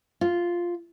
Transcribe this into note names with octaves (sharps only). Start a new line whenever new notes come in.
F4